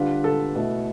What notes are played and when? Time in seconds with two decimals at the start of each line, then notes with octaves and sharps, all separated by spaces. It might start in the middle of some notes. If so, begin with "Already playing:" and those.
Already playing: D3 G3 D4 F4 B4
0.24 A4
0.56 B2 A3 E4